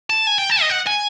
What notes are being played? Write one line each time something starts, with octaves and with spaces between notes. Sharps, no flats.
A5
G#5
G5
A5
D#5
F#5
G#5